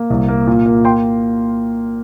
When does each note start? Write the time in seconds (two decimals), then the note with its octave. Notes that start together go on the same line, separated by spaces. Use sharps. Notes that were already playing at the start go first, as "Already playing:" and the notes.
Already playing: A#3
0.10 C2
0.28 A#3
0.47 A#2
0.66 A#3
0.85 G5 C6